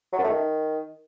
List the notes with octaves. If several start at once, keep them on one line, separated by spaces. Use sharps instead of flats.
F#3
F#2
A3
D#3